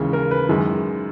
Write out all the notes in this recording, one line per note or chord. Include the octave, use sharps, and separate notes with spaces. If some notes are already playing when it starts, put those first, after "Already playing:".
Already playing: D#2 C#3 E3 G#3 G#4
A#4
B4
F#2 D#3 G#3